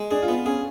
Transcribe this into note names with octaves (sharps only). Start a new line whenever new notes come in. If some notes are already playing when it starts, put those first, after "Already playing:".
Already playing: G#3
D4 G#4
F4
B3
F4
C#4 G#4